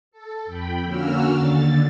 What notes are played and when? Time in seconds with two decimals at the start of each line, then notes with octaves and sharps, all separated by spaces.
0.11 A4
0.45 F2 G5 B5
0.84 D3 A#3 C#4 F#4 E6 F6
1.31 D#2 D3 A6